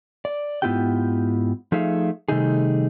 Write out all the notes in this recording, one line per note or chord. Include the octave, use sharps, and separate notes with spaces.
D5
G#2 B3 E4 F4 G4 G5
F3 A3 D#4 G#4 E5 F5
C3 D#3 G3 A3 D#4 G#4